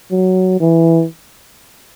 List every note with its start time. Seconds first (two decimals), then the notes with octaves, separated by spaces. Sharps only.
0.11 F#3
0.60 E3